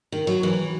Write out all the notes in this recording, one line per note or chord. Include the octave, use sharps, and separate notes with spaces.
D#3
F#3
E3